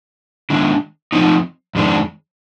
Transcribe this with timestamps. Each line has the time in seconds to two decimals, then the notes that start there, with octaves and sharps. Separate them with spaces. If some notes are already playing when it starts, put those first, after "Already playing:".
0.50 D#3 G#3 D4
1.13 F3 C4 D#4
1.75 F2 D#3 G#3 D4